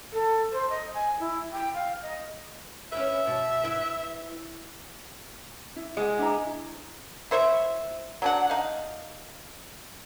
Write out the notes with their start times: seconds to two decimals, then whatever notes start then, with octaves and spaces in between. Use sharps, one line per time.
0.13 A4
0.52 C5
0.69 D#5
0.94 G#5
1.19 E4
1.52 G5
1.74 F5
2.02 D#5
2.92 C#4 E4 B4 E5
3.27 B2
3.63 E4 B4
5.76 E4
5.97 G#3 G#4 F#5
6.19 D4 E4 A#5
7.31 E4 C5 C#5 E5
8.22 F#3 D4 F#5
8.50 D#4 F5